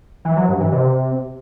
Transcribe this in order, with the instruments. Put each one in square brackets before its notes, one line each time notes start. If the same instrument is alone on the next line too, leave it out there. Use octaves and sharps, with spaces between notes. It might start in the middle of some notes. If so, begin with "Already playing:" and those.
[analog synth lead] E3
F#3
G2
E3
C3